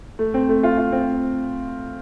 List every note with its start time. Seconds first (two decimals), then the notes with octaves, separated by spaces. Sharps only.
0.19 A3
0.34 C4
0.49 A3
0.63 F4
0.78 F4
0.92 C4